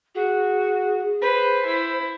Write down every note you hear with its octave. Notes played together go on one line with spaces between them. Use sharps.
F#4 G#4
B4 C5
E4